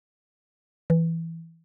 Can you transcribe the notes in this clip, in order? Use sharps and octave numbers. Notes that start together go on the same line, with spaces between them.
E3